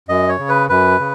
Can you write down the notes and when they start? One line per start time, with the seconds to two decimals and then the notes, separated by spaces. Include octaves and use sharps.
0.09 F#2 D#5
0.29 C#5
0.39 C#3
0.49 B4
0.69 F#2 B4
0.99 C#3